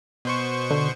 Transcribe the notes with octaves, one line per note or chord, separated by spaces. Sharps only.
B2 C5 C#6
D3